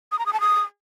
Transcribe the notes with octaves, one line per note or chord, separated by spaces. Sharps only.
D#6
A#5
D#6
A5
D#6